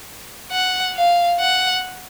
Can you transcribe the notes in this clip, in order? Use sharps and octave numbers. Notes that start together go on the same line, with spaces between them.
F#5
F5
F#5